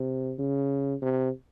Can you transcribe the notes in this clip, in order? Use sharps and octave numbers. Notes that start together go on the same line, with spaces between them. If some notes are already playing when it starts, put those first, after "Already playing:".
Already playing: C3
C#3
C3